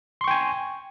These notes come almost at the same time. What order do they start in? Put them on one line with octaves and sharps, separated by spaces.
C6 C#6 G5 G#5